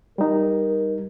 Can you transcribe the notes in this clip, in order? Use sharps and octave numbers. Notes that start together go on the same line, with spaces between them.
G3 D#4 A#4